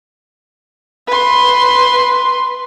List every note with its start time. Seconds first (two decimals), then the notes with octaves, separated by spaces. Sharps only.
1.08 B4 C6